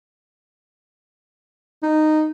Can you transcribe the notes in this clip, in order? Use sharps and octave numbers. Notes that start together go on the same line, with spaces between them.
D#4